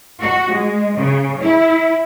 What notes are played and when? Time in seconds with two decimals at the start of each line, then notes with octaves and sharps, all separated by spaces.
0.21 F#4
0.53 G#3
0.98 C#3
1.41 E4